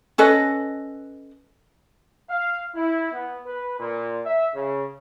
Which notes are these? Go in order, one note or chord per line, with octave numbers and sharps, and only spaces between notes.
C#4 A4 B4 D#5
F5
E4
B3
B4
A#2
E5
C#3